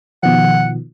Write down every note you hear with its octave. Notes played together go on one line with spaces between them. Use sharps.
B2 D#3 F3 F#5